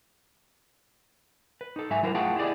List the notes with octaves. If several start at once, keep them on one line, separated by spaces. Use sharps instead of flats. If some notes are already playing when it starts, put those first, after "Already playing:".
B4
D#4 A4
G#2 F#3 D#4 E5 G#5
F#3 E4 A#4 C5
A3 F4 G#4 F#5 G5 A5
E4 G4 G#4 D5 D#5